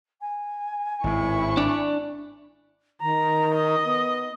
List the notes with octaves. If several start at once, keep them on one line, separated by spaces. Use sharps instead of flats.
G#5
G#1 A2 E4 C#6
D4 D5
D#3 A#5
D#5
B3